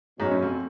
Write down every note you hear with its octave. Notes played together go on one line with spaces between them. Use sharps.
G#2 B2 F#3 C#4
F#2
F2